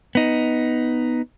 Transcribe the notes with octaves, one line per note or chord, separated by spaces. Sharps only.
B3 D#4